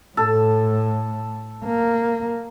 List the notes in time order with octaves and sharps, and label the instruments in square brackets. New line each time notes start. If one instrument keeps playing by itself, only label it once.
[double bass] A2 [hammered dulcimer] A4
[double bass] A#3